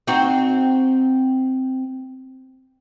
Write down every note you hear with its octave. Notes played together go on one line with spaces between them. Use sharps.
C4 D#4 F#4